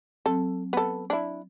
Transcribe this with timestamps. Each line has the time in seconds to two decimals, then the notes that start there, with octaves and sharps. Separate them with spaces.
0.26 F#3 C4 A4
0.73 B3 A4
1.10 D4 E4